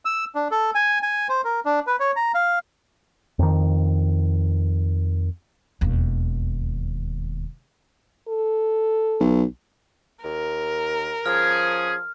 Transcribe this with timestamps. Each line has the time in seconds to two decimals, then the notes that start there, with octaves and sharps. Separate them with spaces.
0.05 E6
0.35 D4
0.51 A4
0.75 G#5
1.03 G#5
1.29 C5
1.44 A#4
1.65 D4
1.87 B4
2.00 C#5
2.16 A#5
2.34 F5
3.39 F2 D#3
5.81 E1 D#2
8.28 A4
9.20 B1
10.24 D#2 A#4
11.26 F3 C#4 G#4 F6